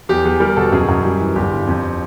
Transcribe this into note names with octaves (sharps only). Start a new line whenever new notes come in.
E2 G4
E2 G#4
G3 A#4
B2 A4
F#2 G#4
F#2
G3
E3
G1 G4
G1
F2